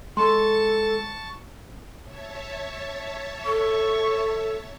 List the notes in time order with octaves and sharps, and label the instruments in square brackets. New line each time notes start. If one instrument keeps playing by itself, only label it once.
[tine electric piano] G#3 [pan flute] A4 [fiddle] A5 C#6 [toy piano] C6
[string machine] C#5 E5 A5
[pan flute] A4 [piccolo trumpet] C#6